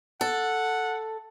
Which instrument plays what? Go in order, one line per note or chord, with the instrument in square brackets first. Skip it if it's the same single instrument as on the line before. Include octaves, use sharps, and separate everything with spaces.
[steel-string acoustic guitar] A4 [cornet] F#5